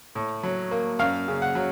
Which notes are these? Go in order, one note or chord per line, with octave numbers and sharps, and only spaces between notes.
A2
F#3
A#3
F#2 F5
C#3
F#5
F#3